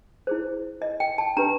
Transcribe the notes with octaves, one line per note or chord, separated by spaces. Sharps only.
E4 G#4 C5
D#5
G5
A5
D4 G4 B4 A#5